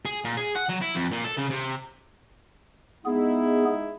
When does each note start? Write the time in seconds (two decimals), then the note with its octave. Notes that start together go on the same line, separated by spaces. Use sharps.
0.06 G#4
0.25 A#2
0.37 G#4
0.55 F#5
0.70 F#3
0.82 E4
0.96 F2
1.12 A#2
1.25 A4
1.38 C#3
1.50 C3
3.05 G#3 B3 D#4 E4 G#4